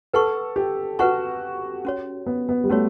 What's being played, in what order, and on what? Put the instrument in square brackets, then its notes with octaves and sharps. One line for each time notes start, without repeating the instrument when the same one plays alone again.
[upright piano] A4 [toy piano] B4 F#5 A5 C#6
[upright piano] G4
[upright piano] F#4 [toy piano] B4 F#5 A5 C#6
[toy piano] C#4 F#4 C#5
[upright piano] B3
B3
G3
[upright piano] A3 [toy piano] C#4 F#4 C#5